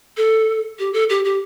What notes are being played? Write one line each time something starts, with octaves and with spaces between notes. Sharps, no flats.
A4
G4
A4
G4
G4